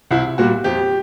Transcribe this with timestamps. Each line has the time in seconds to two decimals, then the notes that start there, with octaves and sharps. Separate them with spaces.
0.11 C2 E4
0.38 A#2 G3 F#4
0.64 F2 G4